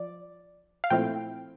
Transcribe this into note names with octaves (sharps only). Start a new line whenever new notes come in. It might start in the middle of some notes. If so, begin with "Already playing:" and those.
Already playing: F3 D5
F5
A#2 F3 A3 C4 E4 G5